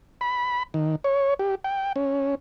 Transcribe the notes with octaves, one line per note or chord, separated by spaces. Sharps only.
B5
D#3
C#5
G4
G5
C#4